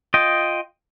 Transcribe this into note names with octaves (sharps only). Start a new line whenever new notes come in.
F4 D#5 G5